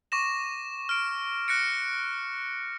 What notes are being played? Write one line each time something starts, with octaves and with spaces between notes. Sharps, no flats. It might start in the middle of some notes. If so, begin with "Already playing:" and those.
C#6 D6 A#6 E7
F6 D7
F#6 A#6 C#7 D7